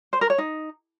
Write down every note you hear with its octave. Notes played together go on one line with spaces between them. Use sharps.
C5
A#4
C#5
D#4